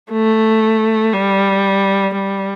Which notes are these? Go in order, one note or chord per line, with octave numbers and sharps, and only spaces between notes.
A3
G3
G3